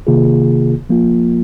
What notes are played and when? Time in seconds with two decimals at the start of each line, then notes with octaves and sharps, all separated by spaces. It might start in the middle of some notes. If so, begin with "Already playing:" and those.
0.07 C3 D#3 A#3 F4 G#4
0.90 F3 A#3 F4